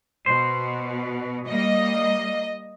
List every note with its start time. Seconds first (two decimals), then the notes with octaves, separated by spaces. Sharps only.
0.26 B2 C5
1.48 G3 A#3 D#5